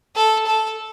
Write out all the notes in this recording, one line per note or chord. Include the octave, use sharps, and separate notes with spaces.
A4
A4